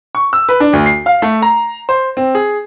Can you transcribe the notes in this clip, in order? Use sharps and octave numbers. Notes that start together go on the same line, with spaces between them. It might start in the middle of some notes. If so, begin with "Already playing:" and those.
C#6
E6
B4
D4
D2
C7
F5
A3
A#5
C5
C4
G#4